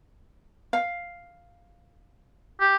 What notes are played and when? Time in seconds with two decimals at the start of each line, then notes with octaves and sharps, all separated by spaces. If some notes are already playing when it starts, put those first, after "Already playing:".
0.73 F5
2.60 G4